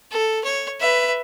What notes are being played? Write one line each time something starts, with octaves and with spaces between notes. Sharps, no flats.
A4
C#5
B4 E5